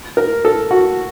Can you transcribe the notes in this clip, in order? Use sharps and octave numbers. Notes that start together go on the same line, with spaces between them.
A#4
A4
F#4